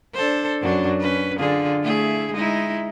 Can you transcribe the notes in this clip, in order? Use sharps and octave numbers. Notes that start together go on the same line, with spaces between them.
D4 A4 C5
F#2 F#3 D4
C#4 B4
D3 F4 G#4
A3 E4 G#4
G#3 D#4 E4